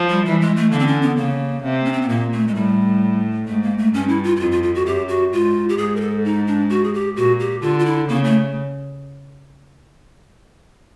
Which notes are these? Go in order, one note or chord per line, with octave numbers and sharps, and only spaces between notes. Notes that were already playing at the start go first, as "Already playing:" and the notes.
Already playing: F3
G3
E3 G3
G#3
A3
D3 A#3
C4
C#4
B3
C#3 A#3
C3
C#4
C4
B3
A#2 A#3
A3
G#3
A2 G3
G#2 A3
A#3
A3
G2 C#4
E4
F4
E4
F2 F4
F4
F4
F#4
F#2 G4
F#4
G#2 F4
G4
G#2 G#4
A#4
A4
D#4
D4
F#4
G#4
G4
A#2 F#4
G4
D3 F4
F4
E4
C#3 A#3
A3